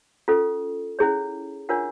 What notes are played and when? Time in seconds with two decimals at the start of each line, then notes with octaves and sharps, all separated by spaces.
0.28 C#4 F4 A4
0.99 C#4 E4 G#4 C#5
1.69 D4 F4 A#4 C#5 F#5